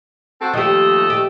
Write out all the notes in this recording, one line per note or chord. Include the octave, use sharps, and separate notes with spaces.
C4 F#4 A4
D#2 F3 A3 G4 D#5
G4